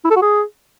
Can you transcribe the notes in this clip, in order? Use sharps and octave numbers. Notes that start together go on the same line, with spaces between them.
E4
A4
F#4
G#4